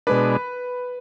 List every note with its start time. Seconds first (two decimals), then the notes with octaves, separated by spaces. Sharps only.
0.07 B2 G#3 D4 B4